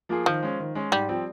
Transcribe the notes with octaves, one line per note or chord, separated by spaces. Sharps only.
F3 A#3 F4 G#4
D#3 F3
G#3 C#4
D#3
G#3 C#4
G#2 G3
F3 C4